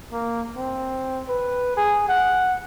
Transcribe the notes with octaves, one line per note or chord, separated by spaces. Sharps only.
A#3
C4
B4
G#4
F#5